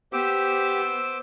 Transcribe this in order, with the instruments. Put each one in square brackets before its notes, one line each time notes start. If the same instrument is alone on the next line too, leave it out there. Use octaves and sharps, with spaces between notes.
[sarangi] B3 [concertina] G4 [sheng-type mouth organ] C5 D6 [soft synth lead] E6